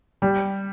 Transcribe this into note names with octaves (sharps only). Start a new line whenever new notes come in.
G3